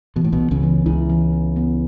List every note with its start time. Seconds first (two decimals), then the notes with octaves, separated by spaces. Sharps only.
0.16 B2 E3
0.24 A2
0.32 B1 B2
0.40 B3
0.51 C#2 C#3
0.63 E3
0.86 C#2 C#3 E4
1.10 E3
1.33 B3
1.56 B3